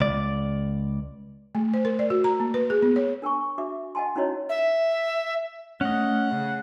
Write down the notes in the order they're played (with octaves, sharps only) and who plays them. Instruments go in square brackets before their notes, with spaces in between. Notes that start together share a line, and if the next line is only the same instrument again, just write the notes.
[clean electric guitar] C#2 D5
[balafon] A3
C5
A#4
D5
F#4
A#5
A#3
B4
G#4
B3
C#5
[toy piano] D4 A#4 G#5 C#6
D4 F#4 E5 D6
D#5 F#5 G#5 A5 C6
C#4 D#4 E4 F#4 C#5 D#5
[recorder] E5
[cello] A3 [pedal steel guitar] C#4 D#5 [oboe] F#5
[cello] C#3